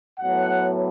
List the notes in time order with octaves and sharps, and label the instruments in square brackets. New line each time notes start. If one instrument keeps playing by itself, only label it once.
[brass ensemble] A2 F#3 B3 F#5